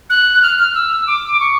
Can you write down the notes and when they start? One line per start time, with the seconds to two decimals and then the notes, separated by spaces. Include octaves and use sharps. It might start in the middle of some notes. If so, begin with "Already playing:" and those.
0.10 F#6
0.42 F6
0.58 F6
0.75 E6
1.07 D6
1.40 C#6